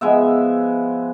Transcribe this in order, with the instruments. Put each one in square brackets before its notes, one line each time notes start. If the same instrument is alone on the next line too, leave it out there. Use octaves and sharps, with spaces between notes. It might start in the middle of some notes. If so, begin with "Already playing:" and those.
[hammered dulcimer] F3 G#3 B3 E5